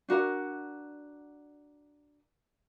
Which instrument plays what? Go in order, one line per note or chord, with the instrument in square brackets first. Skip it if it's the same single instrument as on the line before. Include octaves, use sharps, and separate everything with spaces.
[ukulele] D4 F#4 A#4 F#5